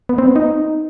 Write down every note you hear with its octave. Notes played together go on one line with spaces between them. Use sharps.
B3
C4
B3
D#4